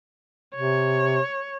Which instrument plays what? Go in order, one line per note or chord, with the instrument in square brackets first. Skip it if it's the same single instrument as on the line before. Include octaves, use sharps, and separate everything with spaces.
[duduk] C3 [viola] C#5